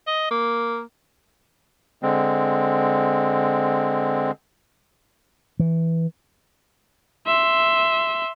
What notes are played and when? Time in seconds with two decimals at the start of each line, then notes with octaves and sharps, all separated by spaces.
0.07 D#5
0.31 A#3
2.03 D3 G#3 C4
5.59 E3
7.26 E5 C6